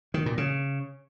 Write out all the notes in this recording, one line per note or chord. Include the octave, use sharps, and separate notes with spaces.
D#3
A#2
C#3